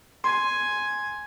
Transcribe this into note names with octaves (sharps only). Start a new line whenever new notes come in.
G#5 C6